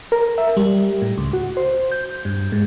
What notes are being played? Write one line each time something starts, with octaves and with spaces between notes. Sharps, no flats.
A#4
E5
G3
A2
C#2
F#4
C5
G6
G2
G#2